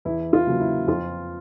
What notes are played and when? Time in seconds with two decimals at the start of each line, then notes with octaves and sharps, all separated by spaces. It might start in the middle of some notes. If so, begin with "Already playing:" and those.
0.05 E2 E4
0.33 F4
0.47 C#3 F#3 A#3
0.60 E4
0.87 F2 F4